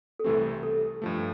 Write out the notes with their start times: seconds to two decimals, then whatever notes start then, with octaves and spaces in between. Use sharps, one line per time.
0.19 A4
0.24 C2 C3 E3 A3 C4 G4
0.63 A4
1.02 G2 F3 A3